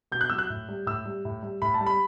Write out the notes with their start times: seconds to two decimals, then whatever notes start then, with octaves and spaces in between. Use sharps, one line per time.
0.11 B2 G6
0.21 F#6
0.30 F#3 E6
0.39 F#6
0.50 A2
0.69 G3
0.86 A2 E6
1.05 G3
1.25 A2
1.43 G3
1.62 A2 B5
1.74 A5
1.81 G3
1.86 B5